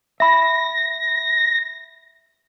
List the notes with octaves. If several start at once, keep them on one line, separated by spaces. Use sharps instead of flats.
E5 B5 A#6